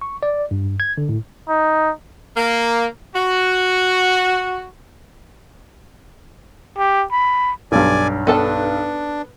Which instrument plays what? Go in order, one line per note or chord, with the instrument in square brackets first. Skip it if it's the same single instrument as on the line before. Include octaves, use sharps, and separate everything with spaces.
[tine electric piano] C#6
D5
G2
G#6
D3
A2
[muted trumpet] D#4
[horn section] A#3
F#4
[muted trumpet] G4
B5
[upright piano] B1 G2 [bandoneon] D5 G#5
[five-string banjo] B3 A4 A5 [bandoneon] D4